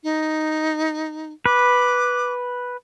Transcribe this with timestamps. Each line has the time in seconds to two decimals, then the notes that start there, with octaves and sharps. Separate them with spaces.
0.04 D#4
1.46 B4 D6